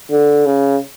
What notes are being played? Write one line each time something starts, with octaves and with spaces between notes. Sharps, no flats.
D3
C#3